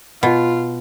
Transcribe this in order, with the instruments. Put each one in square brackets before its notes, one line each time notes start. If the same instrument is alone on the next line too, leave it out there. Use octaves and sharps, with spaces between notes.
[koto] B2 [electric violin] F4